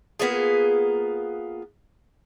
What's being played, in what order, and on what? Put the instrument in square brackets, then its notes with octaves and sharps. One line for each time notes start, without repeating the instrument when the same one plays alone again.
[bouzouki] A#3 B3 F4 G#4